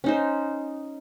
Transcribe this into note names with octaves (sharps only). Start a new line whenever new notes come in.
C#4 D#4 C5